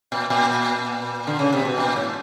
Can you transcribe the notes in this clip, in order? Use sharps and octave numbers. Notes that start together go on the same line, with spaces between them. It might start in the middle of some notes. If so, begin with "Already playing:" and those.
A#2
A#2
D3
C#3
C3
B2
A#2
G#2